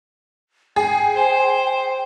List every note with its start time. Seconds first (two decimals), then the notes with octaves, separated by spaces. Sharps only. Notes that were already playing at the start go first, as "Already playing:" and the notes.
0.76 G#4 G5
1.15 C5